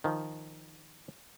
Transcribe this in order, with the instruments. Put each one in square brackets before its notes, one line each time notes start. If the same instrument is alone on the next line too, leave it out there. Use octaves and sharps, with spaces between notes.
[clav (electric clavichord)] D#3 F3